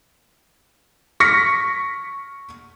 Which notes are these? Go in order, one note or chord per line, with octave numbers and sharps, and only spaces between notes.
C#6 F6 A#6 B6 C#7